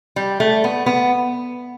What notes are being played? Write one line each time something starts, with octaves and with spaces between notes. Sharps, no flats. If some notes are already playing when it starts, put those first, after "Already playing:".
G3
A3
B3
B3